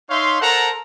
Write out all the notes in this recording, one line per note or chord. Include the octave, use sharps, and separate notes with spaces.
D#4 C#5 E5 F5 C6
A4 A#4 C5 F#5 A5 A#5